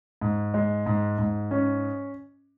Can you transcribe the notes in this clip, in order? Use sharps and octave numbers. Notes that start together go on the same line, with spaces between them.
G#2
G#3
G#2
G#2
C#4